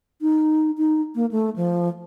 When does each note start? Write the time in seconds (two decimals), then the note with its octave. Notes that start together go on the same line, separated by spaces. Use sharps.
0.22 D#4
0.78 D#4
1.15 A#3
1.31 A3
1.56 F3